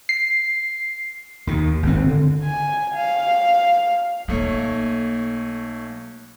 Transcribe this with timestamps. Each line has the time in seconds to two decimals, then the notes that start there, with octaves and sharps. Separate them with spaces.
0.09 C7
1.47 D#2 D#3
1.83 G#1 G2 C4
2.05 D3
2.43 G#5
2.95 F5
4.28 B1 A3 A#3 C#5